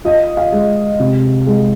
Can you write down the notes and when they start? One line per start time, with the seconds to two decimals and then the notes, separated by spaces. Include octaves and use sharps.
0.05 F4 D#5
0.37 F5
0.52 G#3
1.00 C3
1.46 G#3